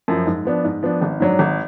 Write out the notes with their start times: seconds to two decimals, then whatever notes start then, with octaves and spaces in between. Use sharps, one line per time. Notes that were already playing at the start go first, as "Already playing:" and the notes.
0.08 F#2 F3
0.27 G#2
0.45 F3 B3 D4
0.64 G#2
0.83 F3 B3 D4
1.02 G#1
1.20 G#2 F#3 D4
1.39 G#1